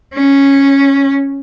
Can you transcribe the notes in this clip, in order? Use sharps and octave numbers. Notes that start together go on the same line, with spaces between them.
C#4